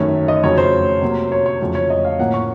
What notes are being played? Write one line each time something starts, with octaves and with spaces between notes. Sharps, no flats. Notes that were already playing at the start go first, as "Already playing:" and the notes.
Already playing: F#2 D#3 A3 C#5
D#5
F2 C#3 F#3 A3 C#5
C5
C3 F#3 A#3 C#4
C#5
C#5
F2 C#3 F#3 A3
C#5
D#5
F5
A2 F3 A#3 C#4 F#5
C#6